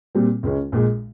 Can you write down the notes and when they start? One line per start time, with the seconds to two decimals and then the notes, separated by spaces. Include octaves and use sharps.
0.15 A#2 G3 C4
0.43 C#2 C#3 G#3 C#4
0.72 A#1 A#2 G#3